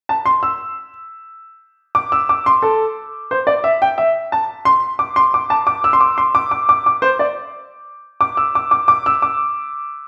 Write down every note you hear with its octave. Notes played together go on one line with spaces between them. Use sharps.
A5
C6
E6
D6
E6
D6
C6
A4
C5
D5
E5
G5
E5
A5
C6
D6
C6
D6
A5
D6
E6
C6
D6
C6
D6
D6
D6
D6
C5
D5
D6
E6
D6
D6
D6
E6
D6